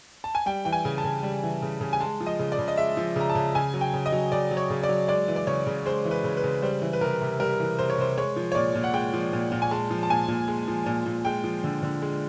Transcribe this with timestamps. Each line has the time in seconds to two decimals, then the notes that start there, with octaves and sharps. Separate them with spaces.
0.24 A5
0.35 G#5
0.46 G3 G5
0.65 E3 G5
0.73 G#5
0.85 C#3
0.98 A5
1.04 C#3
1.23 G3
1.43 E3
1.62 C#3
1.81 C#3
1.93 G#5
2.00 G#3 A5
2.20 F3
2.26 D#5
2.39 C#3
2.52 D5
2.59 C#3
2.68 D#5
2.77 G#3 E5
2.97 F3
3.16 C#3 A#5
3.30 A5
3.35 C#3
3.55 C#3 G#5
3.74 F#3
3.81 G5
3.94 C#3
4.06 D#5
4.12 F#3
4.32 C#3 D5
4.51 F#3
4.57 C#5
4.70 C#3
4.83 D5
4.89 F#3
5.08 G#3 D5
5.28 E3
5.36 D5
5.47 C#3 C#5
5.67 C#3
5.86 G#3 C5
6.05 E3
6.11 B4
6.24 C#3
6.37 B4
6.44 C#3
6.62 G3 C5
6.82 E3
6.93 B4
7.01 C3 A#4
7.21 C3
7.40 G3 A#4
7.60 E3
7.79 C3 C5
7.90 C#5
7.98 C3 C5
8.17 G#3 C#5
8.36 F3
8.52 C#5
8.55 A#2 D5
8.75 A#2
8.84 F#5
8.93 G#3 G5
9.14 F3
9.33 A#2
9.52 A#2
9.62 G#5
9.71 G#3 A5
9.91 F3
10.03 A5
10.10 A#2 G#5
10.28 A#2
10.48 G#3
10.68 F3
10.86 A#2
11.06 A#2
11.25 G#3 G5
11.44 F3
11.64 D3
11.83 D3
12.02 G#3